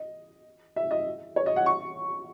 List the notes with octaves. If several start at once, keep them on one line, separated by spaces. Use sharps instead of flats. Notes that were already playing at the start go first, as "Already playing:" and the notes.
Already playing: D#5
E5
D#5
C#5
D#5
F#5
C#6